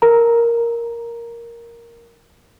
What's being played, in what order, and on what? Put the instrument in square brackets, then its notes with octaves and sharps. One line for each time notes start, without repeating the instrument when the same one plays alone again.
[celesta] A#4 A#5